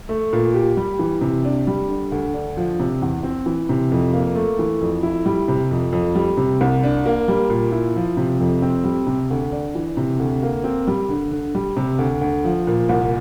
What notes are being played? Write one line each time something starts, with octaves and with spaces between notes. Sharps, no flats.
A3
A#2
G4
G3
E3
C3
D4
G3
D3
D2
D4
F3
C3
E2
C4
E3
C3
F2
A#3
A3
E3
F2
E4
G3
C3
F2
F2
G3
C3
C2
D4
A#3
G3
A#2
E4
F3
C3
F2
C4
G3
C3
D2
D4
E3
C3
D2
A#3
C4
G3
D3
D3
G3
C3
D2
D2
F3
A#2
C2